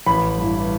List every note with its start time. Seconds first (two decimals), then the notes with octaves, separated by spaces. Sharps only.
0.06 A1 B5
0.38 G2 E3